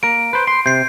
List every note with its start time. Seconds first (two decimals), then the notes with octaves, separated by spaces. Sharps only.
0.03 A#3 A#4 D7
0.33 B4 C5
0.47 C6
0.66 C3 G6 C7